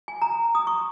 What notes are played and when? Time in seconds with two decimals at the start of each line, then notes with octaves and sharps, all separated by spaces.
0.08 G#5
0.22 A#5
0.55 D#6
0.67 C#6